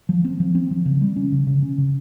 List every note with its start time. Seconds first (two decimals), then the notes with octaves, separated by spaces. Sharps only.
0.09 F3
0.25 C4
0.40 F3
0.55 C4
0.71 F3
0.86 C#3
1.01 G3
1.16 C#4
1.32 C#3
1.47 C#3
1.63 C#4
1.78 C#3